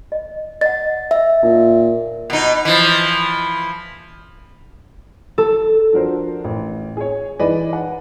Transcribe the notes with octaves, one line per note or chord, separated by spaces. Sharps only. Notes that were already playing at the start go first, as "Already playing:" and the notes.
D#5
D#5 F#5 A6
E5
A#2 D#4
B2 D#4
E3 F3
A4
F3 D4 F#4 A#4 C5
A1
G#4 C#5
E3 D#4 G#4 B4 D5 D#5
F#5